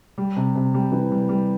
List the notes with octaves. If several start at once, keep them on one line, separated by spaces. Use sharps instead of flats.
G3
C3
C3
G3
E3
G3
G3